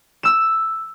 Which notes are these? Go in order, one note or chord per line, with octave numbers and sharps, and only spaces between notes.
E6 E7